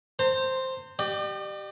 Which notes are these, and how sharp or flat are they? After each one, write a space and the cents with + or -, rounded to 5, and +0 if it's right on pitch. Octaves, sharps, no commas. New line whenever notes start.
C5 +0 A#5 -40
G4 -15 D5 +45